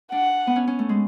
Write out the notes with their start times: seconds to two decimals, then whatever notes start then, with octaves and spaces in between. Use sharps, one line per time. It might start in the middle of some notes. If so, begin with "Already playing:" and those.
0.12 D4 F#5
0.47 B3
0.56 C#4
0.67 C#4
0.79 A3
0.89 G#3